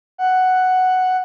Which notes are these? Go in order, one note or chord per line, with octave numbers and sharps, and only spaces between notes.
F#5